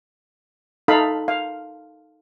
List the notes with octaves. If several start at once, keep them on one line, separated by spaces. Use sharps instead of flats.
D#4 A4 F5 B5
F5